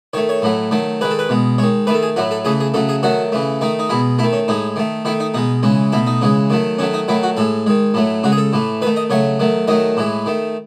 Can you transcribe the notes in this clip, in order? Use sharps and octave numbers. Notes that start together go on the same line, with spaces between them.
D#3 A3 C#5
C#5
A2 F#3 A3
D#3 F#3 A3
D#3 G#3 B4
A4
B4
B2 G#3
D#3 G#3 C#5
D#3 A3 B4
A4
G#4
A2 F#3 A3 F#4
A4
C#3 E3 A3 G#4
G#4
C#3 F#3 A3 A4
G#4
D#3 F#3 A3 F#4
C#3 E3 A3
D#3 A3 D#4
D#4
B2 G#3 E4
D#3 A3 E4
C#4
A2 G#3 D#4
D#3 A3
D#3 A3 E4
D#4
B2 G#3 D#4
C#3 E3 G#3
B2 A3 E4
D#4
C#3 E3 G#3
D#3 F#3 A3
D#3 F#3 A3 C#4
D#4
D#3 F#3 A3 E4
F#4
A2 G#3 A4
D#3 G#3
A2 F#3 A3
C#3 G#3 F#4
G#4
A4
A2 E3 A3
D#3 A3 B4
D#5
C#3 F#3 A3 C#5
D#3 F#3 A3
D#3 F#3 A3 D#5
A2 E3 G#3
D#3 A3